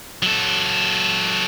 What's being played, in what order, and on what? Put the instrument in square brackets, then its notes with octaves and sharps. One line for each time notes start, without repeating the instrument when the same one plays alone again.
[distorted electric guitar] F#3 A4